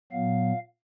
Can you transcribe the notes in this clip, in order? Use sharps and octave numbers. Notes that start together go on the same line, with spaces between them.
A#2 F#3 B3 F5